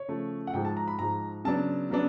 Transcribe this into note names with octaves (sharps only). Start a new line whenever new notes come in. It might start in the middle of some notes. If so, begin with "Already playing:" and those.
Already playing: C#5
C#3 F3 A3
F#5
G#2 F3 G#3 G5
A5
A#5
B5
G#2 F3 G#3 A#5
C#3 F#3 B3 D4 A5
C#3 F#3 B3 D4